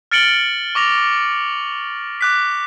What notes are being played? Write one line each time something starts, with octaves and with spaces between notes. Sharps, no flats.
F6 A6 C#7 D7 F#7 G7
C#6 D6 A#6 F7
D6
D6 F#6 B6